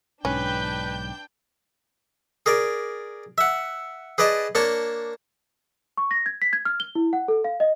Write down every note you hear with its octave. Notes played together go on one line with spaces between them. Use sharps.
B1 G#2 C#4 D4 B4 G5 G6
G#4 A#4 D5
E5 F#5
G#4 B4 D5 D#5 A5
A#3 D4 C#5 A5
C#6
A#6
G#6
B6
G#6
F6
G7
E4
F#5
A4
F5
D#5